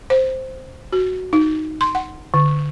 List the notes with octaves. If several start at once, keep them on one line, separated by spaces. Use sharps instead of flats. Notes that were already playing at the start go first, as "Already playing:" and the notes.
C5
F#4
D#4
C6
F#5
D3